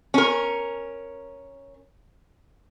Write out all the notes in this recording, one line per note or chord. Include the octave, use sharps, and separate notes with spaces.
C#4 A#4